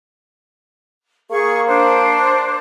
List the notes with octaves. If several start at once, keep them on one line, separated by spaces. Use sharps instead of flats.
A#3 G#4 C#6
D4 C5